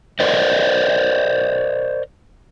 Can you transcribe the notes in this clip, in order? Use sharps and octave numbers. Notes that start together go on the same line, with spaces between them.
A#4 C5 D5 D#5